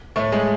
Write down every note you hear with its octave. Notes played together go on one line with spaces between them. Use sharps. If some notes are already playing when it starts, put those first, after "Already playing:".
A2 A3
G#3